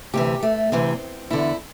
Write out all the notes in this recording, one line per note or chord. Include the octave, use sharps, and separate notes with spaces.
D2 C3 E3 G4
A3
D2 C3 E3 C4
E2 D3 E4